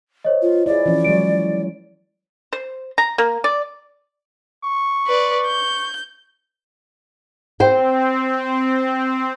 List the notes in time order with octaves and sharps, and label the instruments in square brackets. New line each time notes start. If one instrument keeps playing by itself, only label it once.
[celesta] C5 C#5 D#5
[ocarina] F4
[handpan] E4 F4 G#4 [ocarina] D5
[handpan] E3 F3 C#4
[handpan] F#3 G#3 C#5 [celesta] D7
[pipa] C5
A#5
A#3
D5
[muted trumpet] C#6
[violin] B4 D5
G6
[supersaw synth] C4 [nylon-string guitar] C5 G5